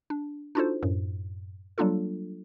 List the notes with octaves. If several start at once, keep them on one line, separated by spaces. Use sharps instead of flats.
D4
D4 D#4 F4 F#4 A4 C5
F#2 A2
F#3 G3 A#3 D4 F4 A4